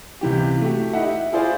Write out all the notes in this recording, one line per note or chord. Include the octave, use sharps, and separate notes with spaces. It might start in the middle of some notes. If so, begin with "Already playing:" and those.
C#2 C3 E3 G4
A3 F#4 G4
D#4 E4 G4 E5 F#5
E5
E4 F4 G#4 C5 D5 F5